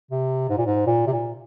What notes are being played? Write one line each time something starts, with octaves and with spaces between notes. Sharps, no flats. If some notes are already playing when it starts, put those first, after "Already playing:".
C3
G#2
A#2
G#2
A#2
C3
A#2